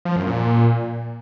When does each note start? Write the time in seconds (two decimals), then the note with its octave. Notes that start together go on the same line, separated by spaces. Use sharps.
0.05 F3
0.16 F#2
0.27 A#2